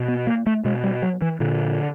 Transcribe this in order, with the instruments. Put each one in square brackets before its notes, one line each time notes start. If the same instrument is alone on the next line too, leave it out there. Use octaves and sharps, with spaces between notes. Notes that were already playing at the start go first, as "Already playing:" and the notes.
Already playing: [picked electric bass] B2
B3
A#3
A3
B2 G#3
G3
F#3
E3
A#2 D3